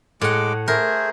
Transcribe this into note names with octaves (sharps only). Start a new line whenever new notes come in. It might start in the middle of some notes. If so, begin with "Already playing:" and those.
A2 G#3 F#5 D6
A3 G#4 A#4 C5